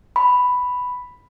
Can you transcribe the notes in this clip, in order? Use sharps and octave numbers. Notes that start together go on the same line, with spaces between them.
B5